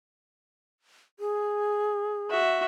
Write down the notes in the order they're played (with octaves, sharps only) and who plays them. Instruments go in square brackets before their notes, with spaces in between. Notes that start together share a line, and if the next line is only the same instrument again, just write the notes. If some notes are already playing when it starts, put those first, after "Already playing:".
[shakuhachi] G#4
[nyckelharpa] F#4 E5